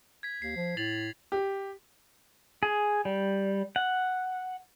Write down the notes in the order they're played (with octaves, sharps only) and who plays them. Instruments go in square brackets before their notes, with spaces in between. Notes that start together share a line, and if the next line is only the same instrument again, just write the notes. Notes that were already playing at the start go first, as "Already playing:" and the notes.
[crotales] G#6 B6
[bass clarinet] D#2 [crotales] C7
[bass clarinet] F3
[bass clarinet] A2 [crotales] A6 F7 F#7
[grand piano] G4
[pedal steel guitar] G#4
G3
F#5